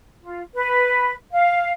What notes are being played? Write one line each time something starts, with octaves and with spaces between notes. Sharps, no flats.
F4
B4
F5